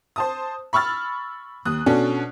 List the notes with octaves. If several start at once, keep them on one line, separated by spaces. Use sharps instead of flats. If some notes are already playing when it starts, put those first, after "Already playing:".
C5 A5 D#6
B5 C#6 E6 F6 A6
D#2 D#6 F#6
B2 C#4 D4 F#4 A4